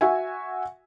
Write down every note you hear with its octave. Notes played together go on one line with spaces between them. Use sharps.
F#4 E5 G#5